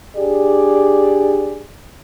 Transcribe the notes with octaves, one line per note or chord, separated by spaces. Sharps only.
D4 G4 G#4 D5